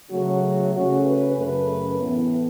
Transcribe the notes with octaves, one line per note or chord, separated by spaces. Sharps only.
C#3 F#3 A3 C#4 F#4
C#3 A3 C#4 F#4
B4
F#2 C#3 A3 B4
A2 E3 B3